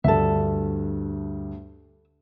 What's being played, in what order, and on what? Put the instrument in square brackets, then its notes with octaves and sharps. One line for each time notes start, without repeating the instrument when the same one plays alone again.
[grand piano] D2 G2 [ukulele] A4 E5